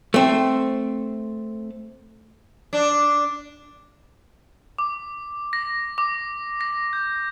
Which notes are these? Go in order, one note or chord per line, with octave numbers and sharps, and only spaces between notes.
A3 C4
D4
D6
A#6
D6
A#6
G6